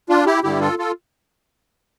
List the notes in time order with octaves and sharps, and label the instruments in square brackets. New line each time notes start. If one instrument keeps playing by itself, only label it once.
[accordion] D4 F4
E4 G4
G2 D3 G3 E4 G4
F4 A4
F4 A4